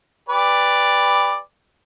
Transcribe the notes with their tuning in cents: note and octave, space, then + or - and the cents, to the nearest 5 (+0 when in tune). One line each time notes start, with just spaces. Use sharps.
G4 +30 B4 +0 D5 +0